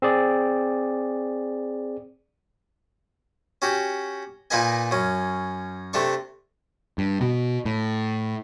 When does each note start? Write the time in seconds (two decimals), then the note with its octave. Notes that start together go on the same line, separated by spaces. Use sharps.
0.02 C4 G#4 D5
3.62 C#4 F#4 G4
4.50 A#2 A#3 D#4 B4 D#5 G#5
4.91 F#2 C#4
5.93 C3 A3 D4 C#6
6.98 G2
7.21 B2
7.65 A2